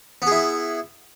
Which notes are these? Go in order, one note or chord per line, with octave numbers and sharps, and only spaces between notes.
B3 E4 G#4